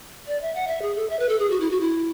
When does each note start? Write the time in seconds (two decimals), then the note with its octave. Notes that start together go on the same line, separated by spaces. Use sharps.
0.27 D5
0.41 E5
0.55 F#5
0.68 E5
0.82 G#4
0.96 A4
1.10 E5
1.19 B4
1.29 A4
1.39 G#4
1.50 F#4
1.60 E4
1.71 F#4
1.81 E4